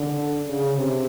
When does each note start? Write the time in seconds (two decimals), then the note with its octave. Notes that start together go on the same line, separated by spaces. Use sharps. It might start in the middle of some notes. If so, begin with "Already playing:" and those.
Already playing: D3
0.48 C#3
0.78 C3